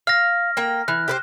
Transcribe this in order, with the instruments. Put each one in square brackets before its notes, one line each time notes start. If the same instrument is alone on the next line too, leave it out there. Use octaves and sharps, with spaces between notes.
[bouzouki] F5 [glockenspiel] F6 A#6
[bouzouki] A#3 G5
[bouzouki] E3 [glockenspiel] F#6
[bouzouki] G4 B4 C5